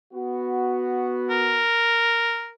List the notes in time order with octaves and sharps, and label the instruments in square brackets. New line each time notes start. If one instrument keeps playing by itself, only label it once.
[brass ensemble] B3 F#4
[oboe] A#4